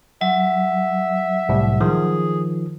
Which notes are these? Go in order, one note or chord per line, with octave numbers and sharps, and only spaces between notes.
F#3 E5
C2 A2
D#3 F3 G#4